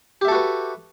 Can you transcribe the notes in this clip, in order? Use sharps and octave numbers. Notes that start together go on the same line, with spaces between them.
F#4 G4 A4 B4 E5